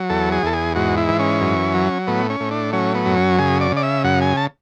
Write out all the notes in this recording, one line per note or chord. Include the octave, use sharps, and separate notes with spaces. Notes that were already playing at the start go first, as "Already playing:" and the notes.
Already playing: F#3
E2 A4
G#4
E2 A4
G#4
G#2 F#4
E4
E3
C#4
F#2
F#3
A2 B3
C#4
A2
D4
F#3 C#4
B3
F#2
C#4
C#3 G#4
D5
C#3 D5
E5
F#2 F#5
G#5
A5